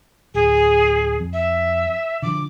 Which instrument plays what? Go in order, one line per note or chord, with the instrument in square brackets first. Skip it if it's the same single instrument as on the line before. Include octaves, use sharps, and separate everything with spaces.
[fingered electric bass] D1 [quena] G#4
[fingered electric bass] F2
[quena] E5
[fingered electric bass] D3 F3 [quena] D6